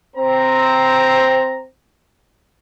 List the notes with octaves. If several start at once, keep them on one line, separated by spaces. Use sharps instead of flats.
C4 C5 A#5